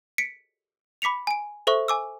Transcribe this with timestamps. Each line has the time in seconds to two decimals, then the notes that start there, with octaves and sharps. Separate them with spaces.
0.18 B6 C#7 D7
1.02 B5 D6 B6 C#7 F7
1.27 G#5 D7
1.67 A4 C5 E5 C#6
1.88 G#5 D6 E6